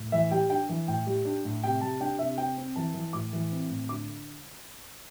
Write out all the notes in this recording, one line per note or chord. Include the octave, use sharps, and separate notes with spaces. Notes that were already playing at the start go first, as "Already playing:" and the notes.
Already playing: A2
E3 E5
G3 G5
D4 G5
E3
A2 G5
G3
D4
A2
C3 G5
G3 A5
D4 G5
C3 E5
C4 G5
C4
E3 A5
E3
A2 D6
E3
C4
A2
D3 D6